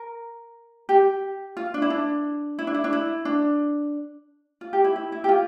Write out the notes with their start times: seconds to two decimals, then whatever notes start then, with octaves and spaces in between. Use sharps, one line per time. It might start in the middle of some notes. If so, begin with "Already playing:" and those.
Already playing: A#4
0.89 G4
1.57 F4
1.74 D4
1.82 E4
1.90 D4
2.59 E4
2.67 D4
2.74 E4
2.84 D4
2.93 E4
3.25 D4
4.61 F4
4.73 G4
4.84 E4
4.96 E4
5.12 E4
5.24 G4
5.29 F4